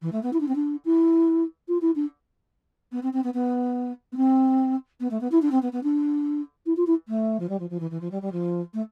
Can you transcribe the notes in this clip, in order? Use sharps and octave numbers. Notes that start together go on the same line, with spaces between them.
E3
A3
B3
E4
D4
C4
D4
E4
F4
E4
D4
B3
C4
C4
B3
B3
B3
C4
B3
A3
B3
E4
D4
C4
B3
B3
D4
E4
F4
E4
A3
F3
G3
F3
F3
E3
E3
F3
G3
G3
F3
A3